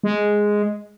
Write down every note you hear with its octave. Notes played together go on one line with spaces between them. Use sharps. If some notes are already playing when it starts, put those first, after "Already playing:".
G#3